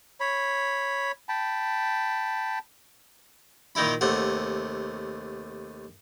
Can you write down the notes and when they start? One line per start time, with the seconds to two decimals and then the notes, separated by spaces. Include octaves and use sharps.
0.20 C#5 B5
1.29 G5 A5 B5
3.75 A#2 D#3 D#4 E4 B5
4.01 D#2 C3 A3 F#5